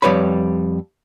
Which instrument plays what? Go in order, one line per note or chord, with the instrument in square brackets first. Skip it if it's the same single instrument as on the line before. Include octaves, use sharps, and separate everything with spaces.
[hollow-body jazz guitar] F2 G3 B4 C#5 B5